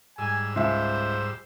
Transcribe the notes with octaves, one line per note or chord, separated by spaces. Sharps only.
G#2 G3 G#5 E6
C#2 C5 E5